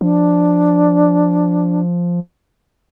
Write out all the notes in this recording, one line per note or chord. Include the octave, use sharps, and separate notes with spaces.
F3 D4